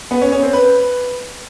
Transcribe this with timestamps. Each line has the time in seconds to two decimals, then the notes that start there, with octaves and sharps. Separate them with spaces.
0.11 B3
0.21 C#4
0.32 C#4
0.43 C4
0.53 B4